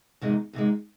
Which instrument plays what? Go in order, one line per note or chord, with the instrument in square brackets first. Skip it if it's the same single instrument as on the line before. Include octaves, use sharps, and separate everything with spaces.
[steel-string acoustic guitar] E2 C3 D#3 G#3
E2 C3 D#3 G#3